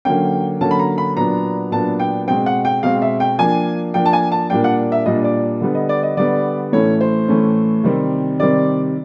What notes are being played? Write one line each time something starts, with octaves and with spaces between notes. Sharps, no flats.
D3 F#3 A#3 C#4 G5
D3 F#3 A#3 C#4 A5
B5
A#5
B5
A#2 F#3 B3 D4 A#5
A#2 F#3 B3 D4 A5
G5
B2 G#3 C4 G5
F#5
G5
B2 G#3 C4 F5
E5
G5
F3 A#3 D4 G#5
F3 A#3 D4 G5
A5
G#5
A5
A#2 G3 A#3 D4 G5
F#5
E5
A#2 G3 A#3 D4 D#5
D5
D3 G3 B3
D#5
D5
D#5
D3 G3 B3 D5
A2 E3 A3 C#4 C#5
C5
A2 E3 A3 C#4
C3 D#3 G3 C4
C3 D#3 G3 C4 D5